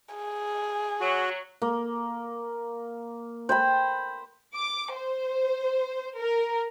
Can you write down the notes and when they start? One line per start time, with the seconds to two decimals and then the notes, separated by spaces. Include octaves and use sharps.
0.15 G#4
1.00 F#3 F#4
1.62 A#3
3.49 C5 G5 B5
4.54 D6
4.93 C5
6.16 A#4